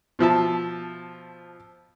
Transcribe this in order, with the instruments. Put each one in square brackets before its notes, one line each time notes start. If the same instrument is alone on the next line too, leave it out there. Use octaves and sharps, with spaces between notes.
[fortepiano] B2 F3 E5 A5